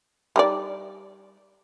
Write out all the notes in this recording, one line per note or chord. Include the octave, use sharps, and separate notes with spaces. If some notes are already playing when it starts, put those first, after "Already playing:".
G3 D#4 D5